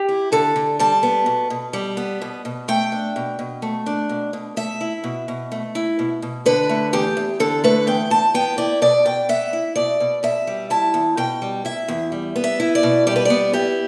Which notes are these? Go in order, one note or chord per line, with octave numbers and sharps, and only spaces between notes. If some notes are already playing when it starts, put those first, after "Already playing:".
Already playing: G4
E4
D3 A4
D3
G3 A5
B3
B2
B2
G3
B3
B2
B2
A3 G5
D4
B2
B2
A3
D4
B2
B2
A3 E5
E4
B2
B2
A3
E4
B2
B2
D3 B4
A3
E2 G4
E2
D3 A4
A3 B4
E2 G5
E2 A5
B3 G5
E4 D5
B2 D5
B2 G5
B3 E5
E4
B2 D5
B2
B2 E5
G3
E4 A5
E2
B2 G5
G3
E4 E5
E2
G3
B3
E5
E4
D5
B2
G3 D5
B4
B3 D5
E4 G4